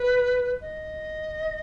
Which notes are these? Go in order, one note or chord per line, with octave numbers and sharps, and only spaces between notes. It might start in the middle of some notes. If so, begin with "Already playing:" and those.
Already playing: B4
D#5